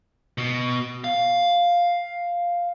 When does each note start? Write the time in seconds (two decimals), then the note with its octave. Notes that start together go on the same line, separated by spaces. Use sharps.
0.38 B2
1.04 F5